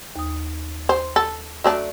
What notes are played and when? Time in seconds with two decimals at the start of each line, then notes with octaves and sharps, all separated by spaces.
0.16 D#2 D#6
0.89 C5
1.16 A4
1.64 F#3 A3 D4